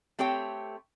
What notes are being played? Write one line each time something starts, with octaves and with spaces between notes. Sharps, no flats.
A3 C4 G4 C#5 G5